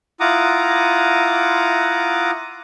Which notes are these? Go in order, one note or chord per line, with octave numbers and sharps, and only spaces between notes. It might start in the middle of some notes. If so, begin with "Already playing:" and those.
E4 F4 F#5 A#5 D6 D#6